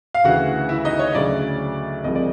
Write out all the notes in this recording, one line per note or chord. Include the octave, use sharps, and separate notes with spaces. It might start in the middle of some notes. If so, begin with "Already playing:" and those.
F5
D2 C#3 E3 F#4 F#5
E4 E5
D#4 D#5
C#5
D2 C#3 F#3 D5
C2 C3 F3 G#3 D#5
D5